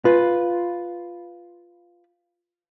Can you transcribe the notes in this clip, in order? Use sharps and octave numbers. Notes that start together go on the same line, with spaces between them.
F4 B4